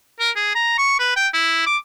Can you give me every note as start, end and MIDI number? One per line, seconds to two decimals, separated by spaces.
0.20 0.30 70
0.36 0.51 68
0.55 0.77 82
0.79 0.97 85
1.00 1.15 71
1.16 1.28 79
1.34 1.63 64
1.66 1.77 86